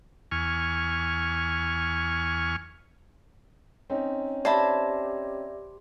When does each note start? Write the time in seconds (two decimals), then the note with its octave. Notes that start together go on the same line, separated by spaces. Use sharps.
0.31 E2 G#5 C#6 F6
3.90 C4 C#4 D#4
4.45 G4 C5 D5 E5 A5 B5